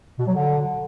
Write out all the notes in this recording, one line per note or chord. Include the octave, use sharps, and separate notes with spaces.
B2
F#3
D3